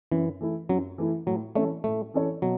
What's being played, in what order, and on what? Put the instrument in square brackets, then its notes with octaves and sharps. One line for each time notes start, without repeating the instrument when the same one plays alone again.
[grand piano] F#2 [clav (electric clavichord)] E3
[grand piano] E3 A3 E4
[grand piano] F#2 [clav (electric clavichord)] F#3
[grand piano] E3 A3 E4
[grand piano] A2 [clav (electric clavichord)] F#3
[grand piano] E3 C#4 A4 C#5 [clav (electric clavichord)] A3
[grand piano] A2 [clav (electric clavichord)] A3
[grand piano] E3 C#4 A4 C#5
[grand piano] B2 [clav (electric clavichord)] F#3